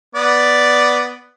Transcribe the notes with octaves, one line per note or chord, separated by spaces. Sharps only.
B3 D5